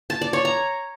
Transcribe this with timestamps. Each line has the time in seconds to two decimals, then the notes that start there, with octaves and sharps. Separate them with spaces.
0.10 A5
0.22 D5
0.33 C#5
0.45 A#5